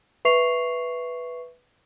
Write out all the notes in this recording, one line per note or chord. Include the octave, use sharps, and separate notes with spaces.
B4 E5 C#6 C7 F7